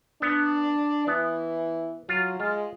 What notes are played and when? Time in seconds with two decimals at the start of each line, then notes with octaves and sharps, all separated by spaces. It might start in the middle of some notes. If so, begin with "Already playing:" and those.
0.22 B3 D4
1.07 E3 B3
2.09 F#3 F4
2.40 G#3 F4